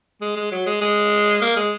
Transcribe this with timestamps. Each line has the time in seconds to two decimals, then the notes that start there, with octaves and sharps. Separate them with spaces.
0.21 G#3
0.36 G#3
0.52 F#3
0.67 G#3
0.81 G#3
1.42 A#3
1.56 G#3